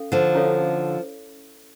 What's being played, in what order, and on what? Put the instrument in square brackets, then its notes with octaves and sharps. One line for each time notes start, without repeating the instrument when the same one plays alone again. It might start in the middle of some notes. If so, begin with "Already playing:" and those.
Already playing: [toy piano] C#4 A4 F5
[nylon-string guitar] D3 F3
[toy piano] C#4 E4 A4 C#5 F5